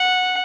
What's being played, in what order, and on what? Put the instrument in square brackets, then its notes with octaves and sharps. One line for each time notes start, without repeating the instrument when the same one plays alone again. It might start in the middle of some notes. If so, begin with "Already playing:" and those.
Already playing: [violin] F#5